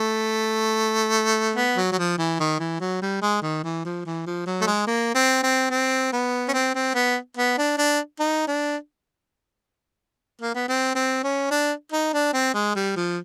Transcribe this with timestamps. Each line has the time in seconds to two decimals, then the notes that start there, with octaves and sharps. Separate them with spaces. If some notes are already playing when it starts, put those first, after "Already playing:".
Already playing: A3
1.56 B3
1.76 F#3
1.92 F#3
1.98 F3
2.18 E3
2.40 D#3
2.59 E3
2.80 F#3
3.02 G3
3.22 G#3
3.42 D#3
3.63 E3
3.85 F3
4.05 E3
4.26 F3
4.46 F#3
4.61 A3
4.67 G#3
4.87 A#3
5.15 C4
5.43 C4
5.70 C4
6.13 B3
6.48 C#4
6.53 C4
6.75 C4
6.94 B3
7.37 B3
7.58 D4
7.78 D4
8.20 D#4
8.47 D4
10.42 A#3
10.55 B3
10.68 C4
10.95 C4
11.23 C#4
11.51 D4
11.92 D#4
12.13 D4
12.34 C4
12.54 G#3
12.76 G3
12.96 F3